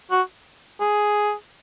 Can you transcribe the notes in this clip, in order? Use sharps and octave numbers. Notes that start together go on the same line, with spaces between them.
F#4
G#4